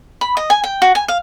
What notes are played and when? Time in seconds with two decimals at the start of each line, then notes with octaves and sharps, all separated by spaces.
0.21 B5
0.37 D#5
0.50 G#5
0.64 G5
0.82 F#4
0.95 G#5
1.08 F5